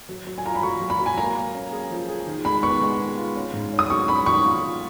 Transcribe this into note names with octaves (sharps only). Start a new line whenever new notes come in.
F#3
F#3
G#5
F4 A#5
B5
F#3 C#6
F#3
B5
F#3
G#5
A#3 A#5
A#3
C#4
G#4
F3
G#4
D#3
G#3 B5
B3 C#6
G#3
B3
F4
C#4
G#2
C#4
D#6
F#3 C#6
C#4 B5
D#3 C#6
F4
F4